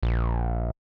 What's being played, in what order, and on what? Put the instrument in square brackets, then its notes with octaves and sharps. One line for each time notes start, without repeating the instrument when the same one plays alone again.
[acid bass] A#1